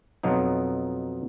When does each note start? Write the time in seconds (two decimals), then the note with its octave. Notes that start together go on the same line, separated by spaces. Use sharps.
0.23 F2 B2 F3 F#3 D#4